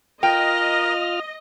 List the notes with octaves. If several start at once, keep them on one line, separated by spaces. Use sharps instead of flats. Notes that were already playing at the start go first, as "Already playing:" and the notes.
F4 A#4 D#5 G5 F6